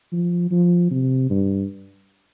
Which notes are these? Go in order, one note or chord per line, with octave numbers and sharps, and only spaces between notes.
F3
F3
C3
G2